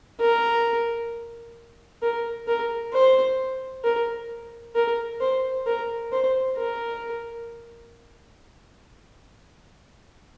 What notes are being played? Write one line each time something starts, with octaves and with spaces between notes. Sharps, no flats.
A#4
A#4
A#4
C5
A#4
A#4
C5
A#4
C5
A#4